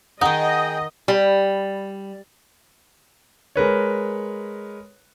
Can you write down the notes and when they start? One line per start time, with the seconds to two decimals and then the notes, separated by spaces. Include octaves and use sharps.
0.21 D#3 D#4 G#4 D#5 F#5 G5
1.08 G3
3.56 G#3 A#4 B4 C#5